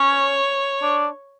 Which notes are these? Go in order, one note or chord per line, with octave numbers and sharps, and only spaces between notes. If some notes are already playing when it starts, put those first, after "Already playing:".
Already playing: C#4 C#5
D4